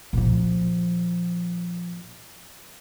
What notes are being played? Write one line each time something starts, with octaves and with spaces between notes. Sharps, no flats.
A#2 F3